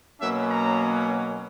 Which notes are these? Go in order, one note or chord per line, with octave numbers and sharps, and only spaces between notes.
B2 F#3 A#3 C#4 E5
A#5